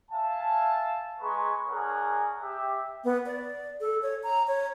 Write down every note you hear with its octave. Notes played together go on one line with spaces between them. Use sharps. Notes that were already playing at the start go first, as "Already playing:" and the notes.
E5 F5 G#5 A5
G#3 G#4 B4 A#5 C#6
D4 G#4 A#4 C#5 F#5 G#5
G4 E5
B3
D5
A4
C#5
A#5
C#5